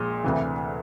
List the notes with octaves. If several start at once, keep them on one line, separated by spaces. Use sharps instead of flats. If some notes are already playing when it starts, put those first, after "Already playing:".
Already playing: A#1 A#2 F3 G#3
D2 C3 E3